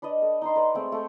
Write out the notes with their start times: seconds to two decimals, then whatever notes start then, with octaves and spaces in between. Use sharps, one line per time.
0.02 D4 B4 D5 D#5
0.22 A4
0.42 D#4 A#5 C6
0.56 B4 D5
0.74 G#3 A3 C4
0.92 A3 A4 G5